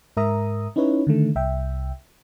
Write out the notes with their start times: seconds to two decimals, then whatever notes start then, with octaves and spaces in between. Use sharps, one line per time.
0.17 G#2 A#4 E5 A#5 D#6
0.76 C#4 D#4 E4 B4 C#5
1.07 D3 D#3 A3
1.36 C2 E5 G5